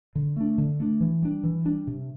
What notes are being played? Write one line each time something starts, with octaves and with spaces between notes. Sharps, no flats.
D3
A3 D4
D3
A3 D4
E3
G3 D4
E3
G3 D4
C3